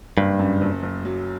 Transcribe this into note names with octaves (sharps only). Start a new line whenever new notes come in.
F#1 G2
F#2
F#1
F#1
F#3